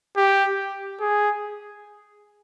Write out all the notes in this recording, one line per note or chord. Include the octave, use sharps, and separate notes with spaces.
G4
G#4